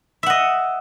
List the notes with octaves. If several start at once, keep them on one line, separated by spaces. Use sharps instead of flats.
D#5 E5 F#5